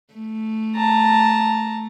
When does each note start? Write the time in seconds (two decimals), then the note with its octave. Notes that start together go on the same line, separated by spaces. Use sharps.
0.14 A3
0.75 A5 A#5